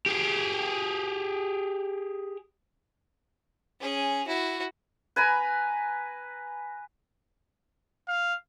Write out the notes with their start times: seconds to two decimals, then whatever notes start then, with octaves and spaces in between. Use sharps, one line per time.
0.06 G4 G#4
3.80 C#4 G#4
4.27 E4 F#4
5.16 B4 G#5 A#5 B5
8.08 F5